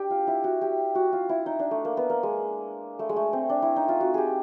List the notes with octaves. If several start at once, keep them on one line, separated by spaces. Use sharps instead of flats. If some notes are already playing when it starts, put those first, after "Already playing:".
Already playing: D4 G4
F4
E4
F#4
G4
F#4
F4
E4
D#4
D4
A3
A#3
B3
A#3
G#3
A3
G#3
A3
C4
D4
E4
D#4
F4
F#4
G4 G#4